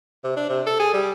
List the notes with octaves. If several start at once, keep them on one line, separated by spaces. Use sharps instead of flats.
C3
D4
C3
A4
G#4
G3